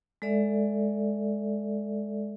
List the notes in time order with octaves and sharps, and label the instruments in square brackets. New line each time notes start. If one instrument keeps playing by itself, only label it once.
[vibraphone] G#3 A4 D5 E5